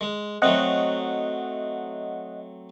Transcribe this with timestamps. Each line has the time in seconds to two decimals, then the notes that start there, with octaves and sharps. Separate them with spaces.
0.01 G#3
0.42 F#3 A3 C4 D#5 F#5